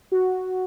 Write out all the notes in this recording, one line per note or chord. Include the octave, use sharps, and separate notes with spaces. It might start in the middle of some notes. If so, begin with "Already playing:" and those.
F#4